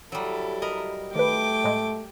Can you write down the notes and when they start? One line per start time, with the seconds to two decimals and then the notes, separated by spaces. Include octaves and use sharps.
0.12 F#3 G3 E4 A4
0.62 A#4 D#5 B5
1.15 D#3 A3 B4 G5 D6
1.64 A2 G#3